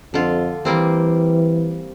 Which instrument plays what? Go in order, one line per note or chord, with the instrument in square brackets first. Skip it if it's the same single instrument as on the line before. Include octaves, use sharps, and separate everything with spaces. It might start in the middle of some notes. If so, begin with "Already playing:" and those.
[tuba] F2 [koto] D3 F4
[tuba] E3 [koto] G3 A#3 C4